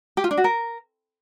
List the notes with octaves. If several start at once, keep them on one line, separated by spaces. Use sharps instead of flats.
G4
F4
D4
F#4
A#4